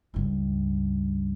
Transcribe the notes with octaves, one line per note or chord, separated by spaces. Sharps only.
C#2 G2